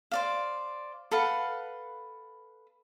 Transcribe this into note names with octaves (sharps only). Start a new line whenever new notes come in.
C5 D5 F5
A4 B4 F5 F#5